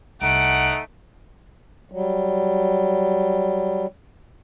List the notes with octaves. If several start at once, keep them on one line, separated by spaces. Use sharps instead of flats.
C2 A3 D#4 F#5 D7
F#3 G3